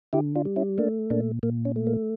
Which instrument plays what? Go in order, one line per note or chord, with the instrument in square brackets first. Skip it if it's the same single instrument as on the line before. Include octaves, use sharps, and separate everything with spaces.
[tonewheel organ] D3 E4 G4
D4 F4
G3
C#4 E4
A3 A#3 D4
A#2 A#3 D4
A#2 A#3
C#4
A3
A#3